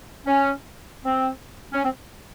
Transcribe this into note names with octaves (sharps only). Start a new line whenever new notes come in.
C#4
C4
C#4
C4